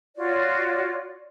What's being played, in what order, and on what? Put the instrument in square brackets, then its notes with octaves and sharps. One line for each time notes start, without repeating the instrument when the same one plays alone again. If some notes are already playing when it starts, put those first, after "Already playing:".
[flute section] F4 F#4 C#5 D5